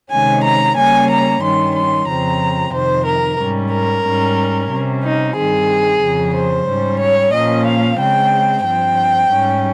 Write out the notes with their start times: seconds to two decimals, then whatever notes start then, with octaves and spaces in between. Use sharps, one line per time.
0.11 C3 D#3 G#3 C#4 G#5
0.44 A#5
0.76 C#3 G3 A#3 C#4 G#5
1.10 A#5
1.42 G2 D#3 G3 C#4 C6
1.75 C6
2.07 F2 C#3 F3 C4 A#5
2.73 F2 C3 D#3 C5
3.06 A#4
3.38 G#2 G3 C#4
3.72 A#4
4.05 G#2 G3 C#4
4.70 C3 G3 C#4
5.03 D#4
5.35 G2 D#3 G3 C4 G#4
6.02 F2 C#3 F3
6.34 C5
6.67 G#2 G3 C#4
7.00 C#5
7.33 A#2 F3 A#3 C#4 D#5
7.66 F5
7.98 C#3 G#3 C4 G5
8.64 G2 F3 C4 G5
9.30 G#2 G3 C#4